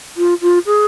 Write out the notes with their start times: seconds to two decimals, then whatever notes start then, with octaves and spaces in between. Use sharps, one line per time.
0.17 F4
0.42 F4
0.66 G#4